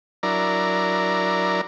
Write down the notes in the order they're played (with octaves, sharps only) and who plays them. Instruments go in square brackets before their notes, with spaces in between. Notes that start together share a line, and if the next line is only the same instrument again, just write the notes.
[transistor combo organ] F#3 D4 E4 A#4 D5 A#5